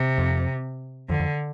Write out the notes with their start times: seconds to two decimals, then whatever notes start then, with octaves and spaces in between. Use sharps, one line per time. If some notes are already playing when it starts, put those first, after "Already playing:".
Already playing: C3
0.18 F2
1.09 F2 D3
1.19 F2